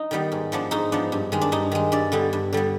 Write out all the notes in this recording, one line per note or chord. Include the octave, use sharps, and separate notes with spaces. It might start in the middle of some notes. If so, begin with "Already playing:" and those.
Already playing: D#4
D#3 G3 B3
G#2
F3 B3 D4
G#2 D#4
F3 B3 D4
G2
D#3 G#3
D4
G2 D#4
D#3 G#3
G2 D5
D3 G3 B3
G2
D3 G3 B3